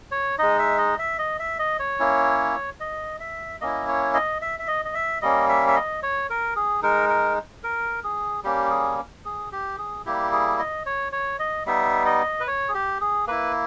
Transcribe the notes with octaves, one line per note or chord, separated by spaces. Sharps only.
C#5
G#3 D#4 D#5
E5
D#5
E5
D#5
E5
D#5
C#5
A#3 C#4 E4
D#5
E5
A#3 C#4 E4 D#5
C#5
D#5
E5
E5
D#5
D#5
E5
G3 A#3 C#4 D#5
E5
E5
D#5
C#5
A#4
G#4
G#3 D#4 A#4
A#4
A#4
G#4
G3 A#3 C#4 G4
G#4
G#4
G4
G#4
G3 A#3 E4 G4
G#4
D#5
C#5
C#5
D#5
G3 B3 D#4 E5
D#5
B4
C#5
G#4
G4
G#4
A#3 E4 B4